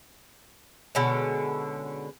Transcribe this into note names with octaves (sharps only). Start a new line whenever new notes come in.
B2 D3 G#3 C#4